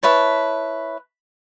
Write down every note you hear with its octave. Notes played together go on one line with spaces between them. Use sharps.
E4 B4 C#5 A5